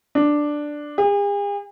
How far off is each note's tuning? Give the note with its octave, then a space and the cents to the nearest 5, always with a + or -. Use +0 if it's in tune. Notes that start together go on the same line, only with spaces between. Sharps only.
D4 +5
G#4 -45